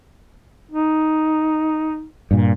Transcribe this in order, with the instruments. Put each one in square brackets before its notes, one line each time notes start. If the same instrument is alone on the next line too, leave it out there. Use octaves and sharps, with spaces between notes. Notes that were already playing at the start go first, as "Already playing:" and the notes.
[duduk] D#4
[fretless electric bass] G2 A#2